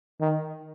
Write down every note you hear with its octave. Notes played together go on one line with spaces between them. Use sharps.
D#3